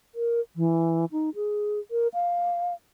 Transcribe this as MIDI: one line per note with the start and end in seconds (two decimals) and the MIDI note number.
0.15 0.40 70
0.56 1.05 52
1.12 1.30 63
1.35 1.79 68
1.91 2.08 70
2.14 2.74 77